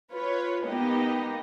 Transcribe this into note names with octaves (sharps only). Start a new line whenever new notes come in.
F4 B4 C#5
A#3 B3 D#4 G4 D#5